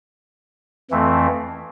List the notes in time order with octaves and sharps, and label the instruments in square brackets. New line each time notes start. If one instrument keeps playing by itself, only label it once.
[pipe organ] F2 E3 A3 C4